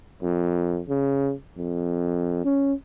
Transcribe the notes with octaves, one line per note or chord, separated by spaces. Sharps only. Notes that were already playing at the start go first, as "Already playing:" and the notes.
F2
C#3
F2
C#4